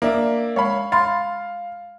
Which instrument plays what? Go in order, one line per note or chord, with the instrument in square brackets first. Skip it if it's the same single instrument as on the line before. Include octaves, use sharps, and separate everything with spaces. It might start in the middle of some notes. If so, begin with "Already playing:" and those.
[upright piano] A#3 D4 E5
[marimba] G#3 [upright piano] C#5 F5 B5
[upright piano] F5 [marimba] B5 C6 A6